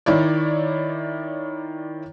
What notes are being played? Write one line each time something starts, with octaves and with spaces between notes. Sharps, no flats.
D#3 E4 C#5 D5